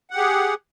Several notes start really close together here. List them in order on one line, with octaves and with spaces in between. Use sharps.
F#5 G4 G#4